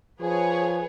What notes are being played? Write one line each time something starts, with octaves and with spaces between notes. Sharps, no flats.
F3 G#4 B4 C#5